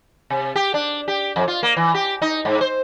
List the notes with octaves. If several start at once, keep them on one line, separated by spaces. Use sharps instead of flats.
C3
G4
D4
G4
F2
F4
A#3
E3
G4
D#4
G#2
C5